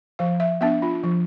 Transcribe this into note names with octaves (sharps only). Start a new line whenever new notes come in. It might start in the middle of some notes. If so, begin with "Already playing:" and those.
F3 F5
E5
B3 D4 E5
F4
F3